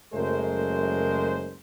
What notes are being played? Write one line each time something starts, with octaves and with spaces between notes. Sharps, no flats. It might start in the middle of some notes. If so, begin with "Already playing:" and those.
F#1 F#2 G#3 A3 A#4 C5